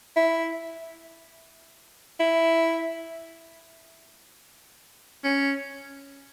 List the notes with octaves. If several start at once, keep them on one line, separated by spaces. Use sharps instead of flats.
E4
E4
C#4